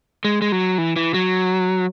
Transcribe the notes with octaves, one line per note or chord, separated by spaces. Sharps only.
G#3
G#3
F#3
E3
E3
F#3